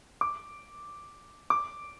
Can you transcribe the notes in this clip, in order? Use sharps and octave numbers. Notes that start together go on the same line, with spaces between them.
D6
D6